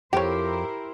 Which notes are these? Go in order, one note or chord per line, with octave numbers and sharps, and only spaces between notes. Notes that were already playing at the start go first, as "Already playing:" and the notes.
F2 E4 G4 A#4 C5 C#5 G5